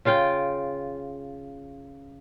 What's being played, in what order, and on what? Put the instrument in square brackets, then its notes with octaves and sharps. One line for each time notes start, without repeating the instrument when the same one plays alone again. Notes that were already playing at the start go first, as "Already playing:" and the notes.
[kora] C#3 F4 F5 G5